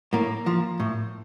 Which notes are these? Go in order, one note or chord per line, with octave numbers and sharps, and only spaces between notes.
A2 A#3
F3
A2